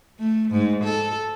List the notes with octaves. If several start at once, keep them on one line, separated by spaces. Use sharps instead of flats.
A3
G#2
A4